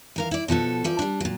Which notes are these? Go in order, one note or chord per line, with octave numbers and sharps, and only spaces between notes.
E3 A#4 F5
E4 D5
B2 F3 F#4 A4
E3 F3 D5
G3 D4
A#2 F#3